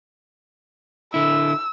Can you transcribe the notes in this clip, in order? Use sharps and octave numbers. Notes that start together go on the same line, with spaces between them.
D3 E4 E6